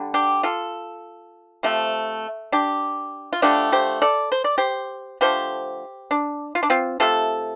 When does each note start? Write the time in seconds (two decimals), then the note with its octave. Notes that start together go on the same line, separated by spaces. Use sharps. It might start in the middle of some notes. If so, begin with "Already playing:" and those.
Already playing: D3 G3
0.14 D4 G4
0.43 F4 A4
1.63 C3 F3 A3
2.52 D4 G4
3.33 F4
3.42 D3 F3 A3 D4 G4
3.72 G4 C5
4.02 A4 D5
4.32 C5
4.44 D5
4.58 G4 C5
5.21 D3 F3 A3 G4 C5
6.11 D4
6.55 F4
6.63 D4
6.70 C4 F4
7.00 C3 A3 F4 A4